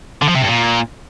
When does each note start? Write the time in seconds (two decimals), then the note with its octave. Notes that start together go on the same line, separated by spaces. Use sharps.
0.22 D3
0.28 F3
0.35 C3
0.41 G2
0.48 A#2